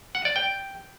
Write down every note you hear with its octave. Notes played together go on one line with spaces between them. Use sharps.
F#5
D5
G5